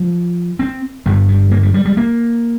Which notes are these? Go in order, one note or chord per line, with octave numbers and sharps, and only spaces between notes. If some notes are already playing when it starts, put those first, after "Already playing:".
Already playing: F3
C4
G1 G2 D3 G3
G3
A#3
G3
G3
G3
A#3